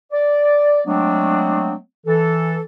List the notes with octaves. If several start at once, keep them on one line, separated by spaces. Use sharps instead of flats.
D5
F#3 G#3 A3 B3 C4 D4
E3 A4